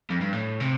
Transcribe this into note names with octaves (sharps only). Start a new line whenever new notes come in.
F2
G2
A2
C3